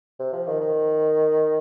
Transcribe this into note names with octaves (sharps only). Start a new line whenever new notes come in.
C3
F3
D#3
D#3